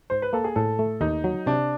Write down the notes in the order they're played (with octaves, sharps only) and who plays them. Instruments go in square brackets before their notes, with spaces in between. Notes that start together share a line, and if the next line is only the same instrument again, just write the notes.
[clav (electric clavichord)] G#2 [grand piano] C5
[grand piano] B4
[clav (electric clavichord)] A#3 [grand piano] A4
[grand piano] G#4
[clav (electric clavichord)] A2 [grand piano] A4
[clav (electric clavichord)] A3
[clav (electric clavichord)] D#2 [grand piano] D#4
[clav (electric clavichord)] F#3
[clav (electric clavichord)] C3 [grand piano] D4